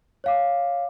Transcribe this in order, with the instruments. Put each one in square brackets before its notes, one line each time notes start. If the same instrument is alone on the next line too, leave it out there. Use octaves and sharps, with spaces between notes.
[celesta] C#5 F5 D6